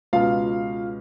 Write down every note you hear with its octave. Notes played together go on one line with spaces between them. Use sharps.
C#2 B2 F4 F5